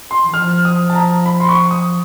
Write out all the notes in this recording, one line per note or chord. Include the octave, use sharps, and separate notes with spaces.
C6
E3
F3 F6
D#6
A5
A#5
B5
C6
C#6
D#6